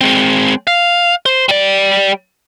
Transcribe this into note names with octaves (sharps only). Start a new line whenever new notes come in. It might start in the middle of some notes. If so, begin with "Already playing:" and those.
G#3 C4
F5
C5
G3 D5